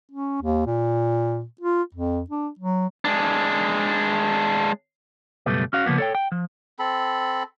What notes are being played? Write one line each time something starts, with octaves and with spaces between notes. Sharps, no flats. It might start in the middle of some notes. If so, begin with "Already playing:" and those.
C#4
D#2
A#2
F4
F2
D4
F#3
G#3 D4
C#2 F#2 B2 G3 A3 B4
C#4 F#4 F5
C#3 F3 A#3 B3
A4 C#5 G5
G5
F3
C4 A4 B5